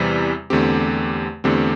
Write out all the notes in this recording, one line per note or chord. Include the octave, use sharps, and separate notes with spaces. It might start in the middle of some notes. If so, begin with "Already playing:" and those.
Already playing: E2 C3 E3 G3
E2 D3 A3 C4 G4
E2 D3 A3 C4 G4